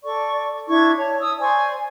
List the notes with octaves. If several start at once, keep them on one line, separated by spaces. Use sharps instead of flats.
A4 D5 C#6
D4 E4 C#6 G#6
C#5 A5
D#6 E6
C5 D5 G#5 C#6